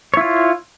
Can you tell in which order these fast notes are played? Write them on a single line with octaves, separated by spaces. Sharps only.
C#5 E4 F4